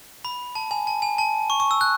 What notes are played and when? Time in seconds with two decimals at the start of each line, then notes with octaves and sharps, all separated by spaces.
0.25 B5
0.55 A5
0.71 G#5
0.87 A5
1.02 G#5
1.18 A5
1.50 C#6
1.60 C#6
1.71 E6
1.81 F#6